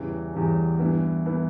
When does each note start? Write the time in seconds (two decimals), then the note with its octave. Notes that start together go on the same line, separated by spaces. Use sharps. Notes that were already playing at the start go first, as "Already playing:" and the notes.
Already playing: E2 C#3 E3 G3
0.33 E2 C#3 E3 G3
0.79 G2 E3 B3 E4
1.26 E3 B3 E4